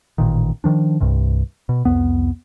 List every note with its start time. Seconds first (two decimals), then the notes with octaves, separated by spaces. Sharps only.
0.18 A1 A#2 D#3
0.64 D#3 F3 D4
1.00 C2 G2 C3
1.69 B2
1.85 C2 F2 B3